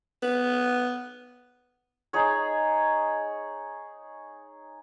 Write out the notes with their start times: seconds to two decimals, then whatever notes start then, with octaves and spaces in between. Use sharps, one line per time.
0.22 B3
2.13 D#4 G#4 C#5